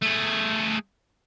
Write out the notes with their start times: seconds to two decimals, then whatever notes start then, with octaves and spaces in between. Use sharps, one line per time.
0.02 A3 G#4